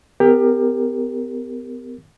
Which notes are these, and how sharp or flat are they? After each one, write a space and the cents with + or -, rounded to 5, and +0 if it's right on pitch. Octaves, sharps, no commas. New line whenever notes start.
B3 +35 G4 +25 A#4 +0